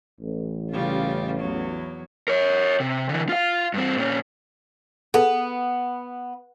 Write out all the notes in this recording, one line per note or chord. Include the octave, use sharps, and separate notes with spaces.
A1
C#3 G3 F4
E2 F#3
A#4 C#5
C3
D3 E3
F4 F5
G2 C4
A#2 C#4
B3 G#4 A4